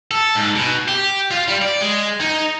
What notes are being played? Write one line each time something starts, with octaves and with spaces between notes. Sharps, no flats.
A4
G#2
B2
G4
F4
G3
D5
G#3
D#4